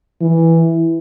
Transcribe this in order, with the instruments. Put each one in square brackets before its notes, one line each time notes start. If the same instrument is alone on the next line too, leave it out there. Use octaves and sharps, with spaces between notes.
[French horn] E3